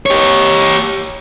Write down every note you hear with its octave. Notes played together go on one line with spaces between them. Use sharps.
G4 C#5